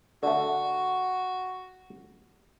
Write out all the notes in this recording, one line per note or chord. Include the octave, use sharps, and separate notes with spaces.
D3 A3 F#4